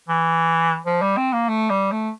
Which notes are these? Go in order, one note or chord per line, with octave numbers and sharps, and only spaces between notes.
E3
F3
G3
C4
A#3
A3
G3
A3